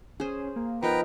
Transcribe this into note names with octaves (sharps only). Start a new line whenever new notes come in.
C#4 G#4 C5
A#3
F3 B3 D#4 A#4 B4 G5 A#5